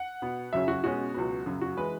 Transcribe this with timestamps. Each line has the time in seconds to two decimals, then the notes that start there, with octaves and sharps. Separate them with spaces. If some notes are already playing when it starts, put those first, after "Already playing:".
Already playing: F#5
0.22 B2 B3
0.52 F#2 C#3 F#3 C#4 E5
0.68 F#4
0.84 B2 G#3 C#4 F#4
1.14 C#2 B2 F#3 B3
1.46 F#2 C#3 F#3
1.61 F#4
1.77 E3 G#3 B4